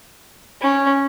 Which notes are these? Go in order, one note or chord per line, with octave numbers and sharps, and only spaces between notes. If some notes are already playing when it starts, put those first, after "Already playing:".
C#4